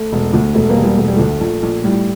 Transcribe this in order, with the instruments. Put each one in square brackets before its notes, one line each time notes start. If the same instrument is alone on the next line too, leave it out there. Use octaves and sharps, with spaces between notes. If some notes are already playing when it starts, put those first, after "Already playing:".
Already playing: [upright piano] A3
E1
D2
E1 A3
G3 A#3
E1
G3 A#3
E1 A3
G3
D2 A3
A#1
A#1
A2 G3